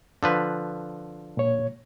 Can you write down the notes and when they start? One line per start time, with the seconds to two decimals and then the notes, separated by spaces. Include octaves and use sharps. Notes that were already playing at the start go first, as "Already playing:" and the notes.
0.23 D3 F3 B4
1.37 A#2 C#5